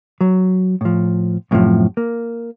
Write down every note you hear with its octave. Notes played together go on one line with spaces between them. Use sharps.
F#3
A2 F3
F#2 A2 C3 D#3 F3
A#3